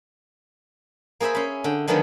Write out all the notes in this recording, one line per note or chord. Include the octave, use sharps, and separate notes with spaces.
A#3 G#4 C5 E5 B5
C#4 B5
D3 G5
D3 D#3 F3 F#3 G#3 B3